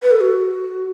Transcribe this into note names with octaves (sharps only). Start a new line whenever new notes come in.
B4
A4
F#4